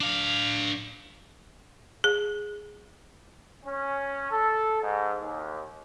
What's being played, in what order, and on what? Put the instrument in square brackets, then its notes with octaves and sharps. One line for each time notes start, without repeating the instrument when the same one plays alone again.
[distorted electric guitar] D4 F5
[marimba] G#4
[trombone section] C#4
A4
G#2
D#2